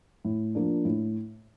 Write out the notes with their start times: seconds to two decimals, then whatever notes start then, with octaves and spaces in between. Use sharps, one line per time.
0.25 A2
0.55 F3 A#3 D4
0.85 A2